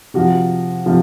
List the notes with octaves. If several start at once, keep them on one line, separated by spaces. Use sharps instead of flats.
C3 F3 F#4
C3 F3